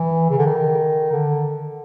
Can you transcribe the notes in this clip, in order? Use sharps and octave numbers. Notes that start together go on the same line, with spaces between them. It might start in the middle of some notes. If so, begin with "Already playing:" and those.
Already playing: E3
C#3
D3
D#3
D3